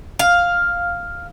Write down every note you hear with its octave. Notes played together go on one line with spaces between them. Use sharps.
F5